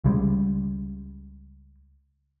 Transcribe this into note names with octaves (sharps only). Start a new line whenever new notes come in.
C#2 C#3 G3 G#3